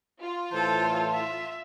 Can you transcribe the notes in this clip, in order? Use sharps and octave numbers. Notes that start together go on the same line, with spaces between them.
F4
A2 E3 A4 C5 A5
E5